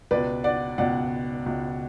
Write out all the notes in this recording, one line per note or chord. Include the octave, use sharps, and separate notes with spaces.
C#2 B2 B4 D5
D5 F#5
C#2 B2 D5 F#5
C#2 B2